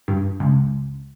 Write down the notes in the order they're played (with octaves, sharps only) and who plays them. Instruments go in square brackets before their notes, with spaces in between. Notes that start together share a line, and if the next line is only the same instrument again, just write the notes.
[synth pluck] G2
C#2